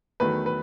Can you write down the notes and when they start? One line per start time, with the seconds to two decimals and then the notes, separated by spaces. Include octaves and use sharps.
0.20 E2 D#3 F#3 A3 B4
0.46 B4